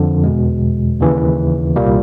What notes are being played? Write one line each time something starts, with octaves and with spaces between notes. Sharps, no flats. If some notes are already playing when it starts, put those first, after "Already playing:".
Already playing: F2 D3 F3
E2 B2 G#3
D#2 C#3 E3
C2 A#2 G3 A#3